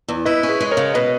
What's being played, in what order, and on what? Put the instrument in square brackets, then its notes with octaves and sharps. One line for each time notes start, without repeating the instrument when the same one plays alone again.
[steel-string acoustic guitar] E2
[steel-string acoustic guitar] E4 [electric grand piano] B4 D#5
[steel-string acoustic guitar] C#4
[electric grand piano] G#4 B4
[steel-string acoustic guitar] G#3
[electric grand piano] A#4 C#5
[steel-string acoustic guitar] C#3
[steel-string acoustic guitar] B2 [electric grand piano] B4 D#5